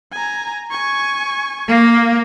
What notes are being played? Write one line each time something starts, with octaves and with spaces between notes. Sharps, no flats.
G#5 A#5
G#5 C#6
A#3